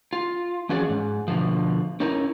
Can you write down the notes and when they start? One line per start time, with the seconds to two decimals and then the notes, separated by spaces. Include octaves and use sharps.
0.13 F4
0.69 E3 F3 C#4 F#4 G#4 D5
0.89 G#2
1.28 B2 D3 F3
2.00 C#4 D#4 E4 A#4